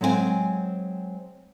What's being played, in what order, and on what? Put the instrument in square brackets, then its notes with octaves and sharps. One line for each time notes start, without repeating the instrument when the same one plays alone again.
[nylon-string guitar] F#3 G#3 C4 E5 G#5